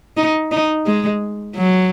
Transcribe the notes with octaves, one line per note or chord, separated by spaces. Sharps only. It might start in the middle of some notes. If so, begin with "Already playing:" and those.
D#4
D#4
G#3
F#3